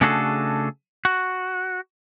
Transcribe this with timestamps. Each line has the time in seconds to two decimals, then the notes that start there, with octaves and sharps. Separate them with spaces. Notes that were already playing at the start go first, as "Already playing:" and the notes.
0.01 C#3 A3 D4 F#4 G#4 A4
1.05 F#4